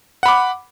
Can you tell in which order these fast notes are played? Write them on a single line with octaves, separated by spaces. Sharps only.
F#5 B5 D6